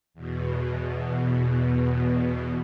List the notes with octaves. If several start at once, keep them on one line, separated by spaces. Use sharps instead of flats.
E2 B2